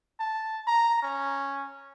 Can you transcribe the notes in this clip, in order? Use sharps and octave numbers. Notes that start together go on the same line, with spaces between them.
A5
A#5
C#4